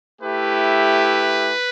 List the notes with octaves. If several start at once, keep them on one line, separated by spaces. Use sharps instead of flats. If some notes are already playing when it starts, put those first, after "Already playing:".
A3 E4 G4 B4